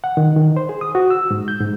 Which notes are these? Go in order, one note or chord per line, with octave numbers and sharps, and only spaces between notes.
F#5
D#3
D#3
C5
G#4
D#6
F#4
E6
G#2
G6
G#2